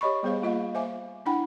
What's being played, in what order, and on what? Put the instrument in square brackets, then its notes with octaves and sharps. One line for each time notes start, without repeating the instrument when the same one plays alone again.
[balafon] G4 C#5 D#5 B5 C#6
G3 B3 G#4 C5 F5
A#3 F4 D#5 F5
C5 E5 F5 G#5 D6
D4 E4 F#5 G5 B5